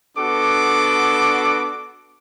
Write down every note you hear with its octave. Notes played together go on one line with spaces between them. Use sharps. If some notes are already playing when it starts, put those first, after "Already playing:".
B3 D4 F#4 A4 D6